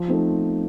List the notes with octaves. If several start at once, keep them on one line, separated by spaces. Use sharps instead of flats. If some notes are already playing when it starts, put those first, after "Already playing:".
Already playing: F3
A3 C4 D#4